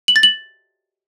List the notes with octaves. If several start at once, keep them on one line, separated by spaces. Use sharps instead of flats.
F#7
A6
F#7